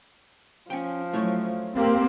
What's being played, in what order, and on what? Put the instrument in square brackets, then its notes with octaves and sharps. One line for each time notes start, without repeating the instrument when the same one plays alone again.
[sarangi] F3 [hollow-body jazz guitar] C#4 G5
[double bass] F#3 [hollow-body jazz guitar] A3 E4 C#5
[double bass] A#3 [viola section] C4 [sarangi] G4